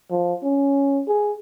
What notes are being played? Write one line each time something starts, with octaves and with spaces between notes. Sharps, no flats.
F3
C#4
G#4